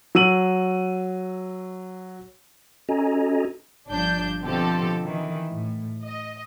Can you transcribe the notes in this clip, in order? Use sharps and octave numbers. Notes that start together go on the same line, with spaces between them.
F#3 E6 D#7 F#7
C#4 F#4 A4 D#5 G#5 A#5
G1 F3 D4 G6
B2 D3 F3 C4 G4 A4
D#3 E3
A2
D#5